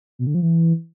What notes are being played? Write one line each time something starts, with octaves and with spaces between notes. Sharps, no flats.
B2
D3
F3
E3